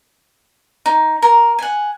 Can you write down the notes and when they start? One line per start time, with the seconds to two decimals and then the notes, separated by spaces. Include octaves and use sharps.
0.86 D#4
1.22 A#4
1.59 F#5 G#5